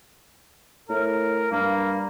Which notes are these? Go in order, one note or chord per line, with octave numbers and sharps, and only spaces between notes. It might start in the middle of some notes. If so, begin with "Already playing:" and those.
A2 A#4
G2 A#3